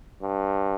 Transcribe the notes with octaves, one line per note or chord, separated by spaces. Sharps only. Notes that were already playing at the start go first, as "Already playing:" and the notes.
G2